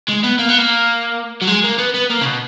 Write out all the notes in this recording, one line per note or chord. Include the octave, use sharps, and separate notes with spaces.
G#3
B3
A#3
B3
A#3
F#3
G#3
A#3
B3
B3
A#3
C#3
B2